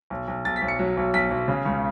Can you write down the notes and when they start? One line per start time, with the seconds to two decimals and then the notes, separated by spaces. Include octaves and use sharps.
0.10 B1
0.28 B1
0.45 B1 A6
0.56 B6
0.62 B1
0.68 C#7
0.79 F#3
0.97 B1
1.14 B1 B6
1.31 B1
1.48 C#3
1.66 C#2